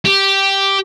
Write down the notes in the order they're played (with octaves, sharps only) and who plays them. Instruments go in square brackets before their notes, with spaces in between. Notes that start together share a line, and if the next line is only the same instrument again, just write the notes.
[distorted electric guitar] G4